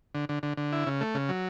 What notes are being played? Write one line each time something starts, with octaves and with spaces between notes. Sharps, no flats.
D3
D3
D3
D3
E4
C#3
A3
C#3
F#3